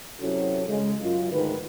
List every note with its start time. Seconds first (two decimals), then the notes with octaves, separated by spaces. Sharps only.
0.20 C3 F#3 C#4 E4 F#4 A4
0.68 C#3 G#3
1.01 F#2 F4
1.32 D2 G#2 D#3 B4